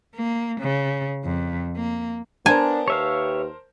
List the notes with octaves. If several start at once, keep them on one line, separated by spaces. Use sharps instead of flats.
A#3
C#3
F2
A#3
B3 D4 A#4 C5 G#5 A5
D#2 G4 B4 C#5 E5 F5